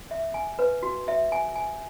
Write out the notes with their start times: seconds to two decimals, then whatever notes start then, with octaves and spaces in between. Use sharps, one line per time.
0.11 E5
0.34 G#5
0.59 B4
0.83 F#4
1.08 E5
1.32 G#5
1.56 G#5